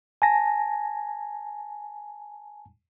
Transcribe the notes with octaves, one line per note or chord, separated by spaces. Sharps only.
G#5 A5 A#6